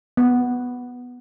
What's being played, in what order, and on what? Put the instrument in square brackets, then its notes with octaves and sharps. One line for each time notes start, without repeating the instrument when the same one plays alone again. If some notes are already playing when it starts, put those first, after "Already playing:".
[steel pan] B3